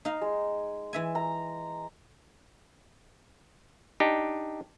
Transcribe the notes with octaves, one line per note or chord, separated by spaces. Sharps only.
D#4 F5
G#3
E3 E5 G#5
A#5
D4 D#4 G4